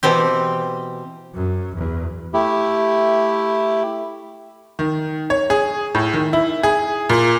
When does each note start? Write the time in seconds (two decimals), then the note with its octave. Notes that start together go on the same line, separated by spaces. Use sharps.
0.03 B2 E3 C4 G4
1.34 F#2
1.76 E2
2.33 A3 E4 G4
4.79 D#3
5.30 C#5
5.50 G#4
5.95 A2
6.14 D#3
6.33 E4
6.63 G#4
7.09 A#2